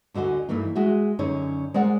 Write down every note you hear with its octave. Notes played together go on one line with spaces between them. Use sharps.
D2 D3 F#4 D#5 G#5
G2 E3 A3 A#3 D#4
G#3 F#4 G#4 E5
F#2 D3 C#4 D#4 C#5
G#3 A#4 C5 D5 F#5